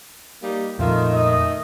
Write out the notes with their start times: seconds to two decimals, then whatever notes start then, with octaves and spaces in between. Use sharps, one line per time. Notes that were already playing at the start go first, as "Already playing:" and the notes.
0.42 G3 A#3 D#4
0.79 F2 A#2 D#3 F3 A3 F4
1.14 D#5